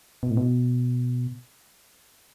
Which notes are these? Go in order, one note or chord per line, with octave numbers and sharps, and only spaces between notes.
B2
A2
B2